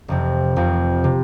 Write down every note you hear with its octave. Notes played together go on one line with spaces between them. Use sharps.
F1 F2 C3
F1 F2 C3
C3